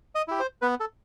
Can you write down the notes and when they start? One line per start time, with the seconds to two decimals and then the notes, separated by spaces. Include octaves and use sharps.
0.15 D#5
0.28 E4 G4
0.39 C5
0.62 B3 B4
0.80 A4